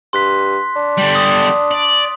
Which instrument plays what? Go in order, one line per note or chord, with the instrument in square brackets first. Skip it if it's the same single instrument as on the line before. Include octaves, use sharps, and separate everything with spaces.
[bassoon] G2 [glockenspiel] C6 F#6 B6
[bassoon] D4
[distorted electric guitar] D3 G3
[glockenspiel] D#6
[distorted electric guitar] D5